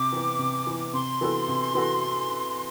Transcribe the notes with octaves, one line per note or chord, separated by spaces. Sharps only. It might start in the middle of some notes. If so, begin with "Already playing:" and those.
Already playing: C3 D6
E3 B3
C3
E3 B3
C3 C6
E3 B3 F#4 A4
C3
E3 B3 F#4 A4